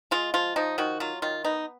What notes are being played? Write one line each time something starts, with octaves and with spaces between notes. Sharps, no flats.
G#3 F4
F3 F4
F3 D#4
D#3 F#4
F#3 F4
D#3 F4
B3 D#4